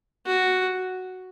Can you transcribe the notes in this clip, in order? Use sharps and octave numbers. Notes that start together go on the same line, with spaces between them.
F#4